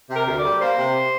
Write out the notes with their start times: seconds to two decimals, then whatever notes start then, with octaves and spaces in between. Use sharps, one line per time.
0.10 C3
0.15 A#4
0.26 D2
0.38 G3 D5
0.60 A#3 C5
0.77 C3